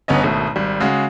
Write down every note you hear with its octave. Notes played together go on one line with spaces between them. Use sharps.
G1 B3 C#4 D#5
G#1 B2 A3
G#1 G3
C#3 G#3 F#4